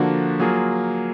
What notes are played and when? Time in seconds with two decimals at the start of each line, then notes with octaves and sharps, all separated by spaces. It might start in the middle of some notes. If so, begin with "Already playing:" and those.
Already playing: D3 F3 A#3 D4 F#4
0.40 F#3 A#3 F4 G#4